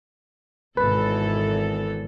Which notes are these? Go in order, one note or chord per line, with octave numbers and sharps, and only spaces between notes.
G#1 B2 E3 A4 B4